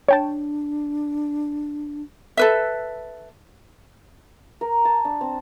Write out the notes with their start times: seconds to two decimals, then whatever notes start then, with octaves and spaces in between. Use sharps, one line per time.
0.08 D4 C#5 G5 A5
2.37 A4 B4 E5
4.61 A#4
4.85 A5
5.05 D4
5.21 C4